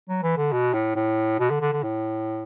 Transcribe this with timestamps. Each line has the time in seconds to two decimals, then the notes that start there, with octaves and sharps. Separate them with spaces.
0.09 F#3
0.23 E3
0.38 D3
0.52 B2
0.74 A2
0.96 A2
1.39 B2
1.50 D3
1.61 D3
1.72 D3
1.83 A2